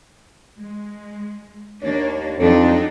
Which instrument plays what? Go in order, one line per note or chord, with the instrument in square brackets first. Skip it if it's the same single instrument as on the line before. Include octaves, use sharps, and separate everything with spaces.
[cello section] G#3
[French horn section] D#2 C#5 [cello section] A#3 D4
[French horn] F2 [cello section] F#3 D4 D#4 [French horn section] A4